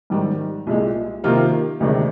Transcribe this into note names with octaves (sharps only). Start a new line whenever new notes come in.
G#2 D#3 G3
C2 A#2 G#3
C3 D#3 A#3 F4
D2 C3 D#3 G#3 D4